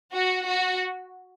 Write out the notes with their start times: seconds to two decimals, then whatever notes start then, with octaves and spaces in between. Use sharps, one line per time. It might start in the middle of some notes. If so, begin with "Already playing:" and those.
0.13 F#4
0.46 F#4